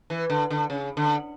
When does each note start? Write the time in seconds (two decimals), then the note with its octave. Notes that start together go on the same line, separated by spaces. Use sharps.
0.10 E3
0.30 D3
0.50 D3
0.70 C#3
0.97 D3